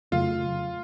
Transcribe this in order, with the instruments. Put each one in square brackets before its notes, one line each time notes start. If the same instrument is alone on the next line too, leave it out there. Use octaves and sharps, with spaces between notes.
[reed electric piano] F2 C#3 F#3 A3 [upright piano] F4